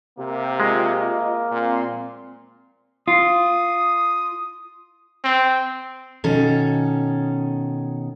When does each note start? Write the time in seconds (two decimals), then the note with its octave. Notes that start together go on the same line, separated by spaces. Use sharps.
0.19 C3 A#3 G4 A#4 E5
0.60 G#3 F4 D#5
1.51 A#2 C4 C6
3.08 F4 D#6
5.24 C4
6.24 B2 D#3 C#4 A4